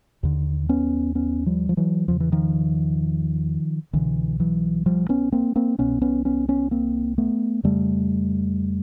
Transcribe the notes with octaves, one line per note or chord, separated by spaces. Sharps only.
D#2 D3
B3 C#4
B3 C#4
F3 G3
F3
E3 F#3
E2 C#3 F3
E3
D#3 F3
C2 B2 D3 E3
E3 F#3
F3 G3
B3 C#4
A#3 C4
A#3 C4
C2 B2 B3 C#4
B3 C#4
B3 C#4
B3 C#4
A#3 C4
A3 B3
F2 C#3 G3 A3